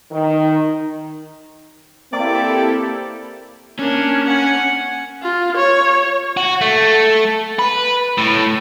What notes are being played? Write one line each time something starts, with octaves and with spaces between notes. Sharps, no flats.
D#3
A#3 C4 E4 G4 A4 D5
A#3 C#4 D4
F#5 G#5
F4
C#5
F#4
A3
B4
A2